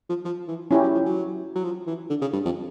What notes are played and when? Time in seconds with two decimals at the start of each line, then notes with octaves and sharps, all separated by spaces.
0.09 F3
0.25 F3
0.48 E3
0.71 F3 C#4 E4 G4
0.82 F#3
0.94 F3
1.05 F#3
1.55 F#3
1.64 F3
1.87 E3
2.10 D3
2.21 C#3
2.33 G2
2.45 F2